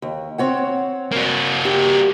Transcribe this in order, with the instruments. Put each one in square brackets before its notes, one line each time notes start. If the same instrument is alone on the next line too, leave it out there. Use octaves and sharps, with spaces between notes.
[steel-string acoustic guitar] D#2
C4 C#5 F#5
[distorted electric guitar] A#3 F#4
[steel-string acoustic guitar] G4